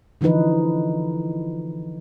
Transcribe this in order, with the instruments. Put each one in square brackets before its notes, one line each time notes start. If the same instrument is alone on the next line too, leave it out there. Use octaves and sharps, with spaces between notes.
[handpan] D3 E3 F3 D#4 B4